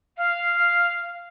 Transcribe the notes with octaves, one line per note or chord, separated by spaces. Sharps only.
F5